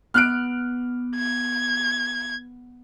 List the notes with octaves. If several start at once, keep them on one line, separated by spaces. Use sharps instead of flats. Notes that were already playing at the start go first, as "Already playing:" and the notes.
B3 F6 F#6 D7
G#6